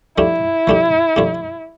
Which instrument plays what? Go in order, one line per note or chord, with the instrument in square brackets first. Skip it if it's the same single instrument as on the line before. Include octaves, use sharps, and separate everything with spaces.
[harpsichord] F3 A3 D4 G4 [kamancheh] E4
[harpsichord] F3 A3 D4 G4
F3 A3 D4 G4